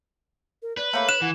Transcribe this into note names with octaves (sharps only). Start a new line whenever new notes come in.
A#4
B4 D5
A3 A#3 C#5 B5
F#6 E7
E3 F#5